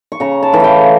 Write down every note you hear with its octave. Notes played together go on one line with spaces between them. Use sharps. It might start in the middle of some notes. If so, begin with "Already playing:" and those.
C#6
C#3 A#5
A5
E3 A3
F5 G5